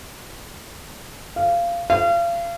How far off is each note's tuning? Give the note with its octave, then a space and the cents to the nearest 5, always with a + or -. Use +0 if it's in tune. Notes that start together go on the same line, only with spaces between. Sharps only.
F5 -20
F5 -35